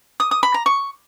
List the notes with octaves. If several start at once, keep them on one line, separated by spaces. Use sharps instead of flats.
D#6
D#6
B5
A#5
C#6